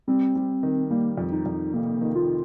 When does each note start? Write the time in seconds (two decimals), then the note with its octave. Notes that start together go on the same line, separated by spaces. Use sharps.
0.07 G3 C4
0.35 G3
0.63 D#3
0.90 G3 A#3
1.18 F2
1.32 D#4
1.46 F2
1.53 D#4
1.73 F1 A#3
2.01 D#3
2.15 F4